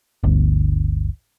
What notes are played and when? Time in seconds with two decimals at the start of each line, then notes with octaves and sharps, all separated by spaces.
0.24 G1 D2